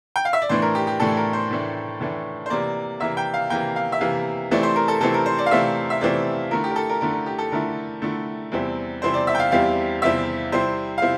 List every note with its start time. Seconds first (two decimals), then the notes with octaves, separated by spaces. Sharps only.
0.16 G5
0.25 F5
0.33 E5
0.42 D5
0.49 A2 E3 A3 D4 C5
0.62 A#4
0.75 G4
0.87 G4
1.00 A2 E3 A3 D4 A4
1.17 A#4
1.33 C5
1.51 A2 E3 A3 D4
2.00 A2 E3 A3 D4
2.46 C5
2.50 C3 E3 A#3 D5
3.00 C3 E3 A#3 E5
3.17 G5
3.34 F5
3.50 C3 E3 A#3 G5
3.76 F5
3.92 E5
4.01 C3 E3 A#3 F5
4.51 C3 E3 A3 C4 E4 D5
4.63 C5
4.76 A#4
4.88 A4
5.00 C3 E3 A3 C4 E4 A4
5.14 A#4
5.26 C5
5.38 D5
5.46 F5
5.51 C3 E3 A3 C4 E4 E5
5.90 E5
6.01 C3 E3 A3 C4 E4 D5
6.51 D3 A3 E4 A#4
6.64 G4
6.71 A#4
6.76 A4
6.89 A#4
7.01 D3 A3 E4 A#4
7.13 A#4
7.26 G4
7.38 A4
7.52 D3 A3 E4 A#4
8.02 D3 A3 E4
8.52 E2 C3 G3 C4 E4
9.02 E2 C3 G3 C4 E4 C5
9.14 D5
9.27 E5
9.35 G5
9.39 F5
9.51 E2 C3 G3 C4 E4 F5
10.02 E2 C3 G3 C4 E4 E5
10.52 C3 G3 C4 E4 C5
10.98 F5
11.02 C3 C4 E4